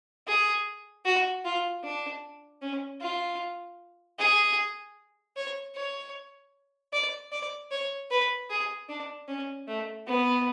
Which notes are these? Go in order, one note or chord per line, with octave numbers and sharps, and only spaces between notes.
G#4
F#4
F4
D4
C#4
F4
G#4
C#5
C#5
D5
D5
C#5
B4
G#4
D4
C#4
A3
B3